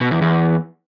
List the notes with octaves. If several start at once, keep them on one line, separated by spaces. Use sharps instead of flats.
B2
E2
E2